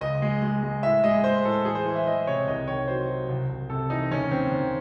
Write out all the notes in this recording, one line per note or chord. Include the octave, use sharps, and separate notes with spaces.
C#2 D#5
G#3
G#3
G#3
A2 E5
G#3 D#5
G#3 C5
A2 A4
E3 G#4
C5
E3
E5
E3 D#5
C3 C#5
C2 D#5
D#3 C#5
F#3 C5
F#3
C2
C2
C3 A4
E3 D#4
D#2 C#4
D#2 C4
D#2